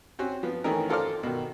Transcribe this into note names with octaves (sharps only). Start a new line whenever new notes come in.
C4 C#4 F#4
F3 B3
D#3 E3 A3 C#4 D#4 A#4
F4 A4 A#4 C5 D5 F6
B2 D#3